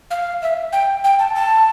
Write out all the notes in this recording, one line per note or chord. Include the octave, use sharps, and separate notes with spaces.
F5
E5
G5
G5
A5
A5